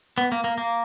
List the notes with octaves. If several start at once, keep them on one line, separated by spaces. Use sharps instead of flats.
B3
A#3
A#3
A#3